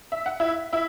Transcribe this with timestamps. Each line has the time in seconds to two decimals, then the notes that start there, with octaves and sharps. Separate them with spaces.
0.12 E5
0.26 F#5
0.40 E4 E5
0.73 E4 E5